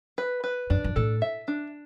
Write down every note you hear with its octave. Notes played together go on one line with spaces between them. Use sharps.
B4
B4
F#2 D4
F#2
A2 A4
E5
D4